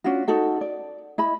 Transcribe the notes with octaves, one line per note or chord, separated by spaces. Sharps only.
C#4 D4 F4 F#4
D#4 F#4 A4 F#5
D5
E4 D#5 B5